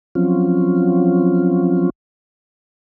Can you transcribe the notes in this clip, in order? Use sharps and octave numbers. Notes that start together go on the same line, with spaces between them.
F3 F#3 C4 C#4 F4